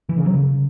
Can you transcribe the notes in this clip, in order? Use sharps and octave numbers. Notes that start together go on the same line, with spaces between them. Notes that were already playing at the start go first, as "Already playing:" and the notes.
E3
C#3
F#3
C#3